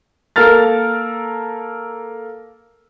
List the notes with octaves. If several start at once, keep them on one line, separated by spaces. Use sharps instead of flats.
A#3 A4 A#4 F6 A6